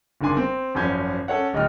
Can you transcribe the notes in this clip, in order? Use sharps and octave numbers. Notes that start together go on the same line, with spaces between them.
F#1 D3 D#3 D4 G#5 C6
C4
G#1 F#2 F3 C#4 G6 G#6
C#4 A4 C#5 F#5
D1 D#4 G5 F6